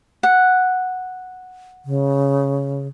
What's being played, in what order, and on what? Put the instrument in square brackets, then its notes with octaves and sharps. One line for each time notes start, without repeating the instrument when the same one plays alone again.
[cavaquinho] F#5
[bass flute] C#3